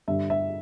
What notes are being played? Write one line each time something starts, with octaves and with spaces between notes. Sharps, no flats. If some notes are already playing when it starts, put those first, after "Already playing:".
G2 D3 G3 E5
E5